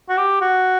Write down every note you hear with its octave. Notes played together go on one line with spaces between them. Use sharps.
F#4
G4
F#4